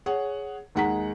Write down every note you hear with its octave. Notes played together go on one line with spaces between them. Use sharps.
G#4 C#5 F#5
D#2 G#3 F#5 A#5 B6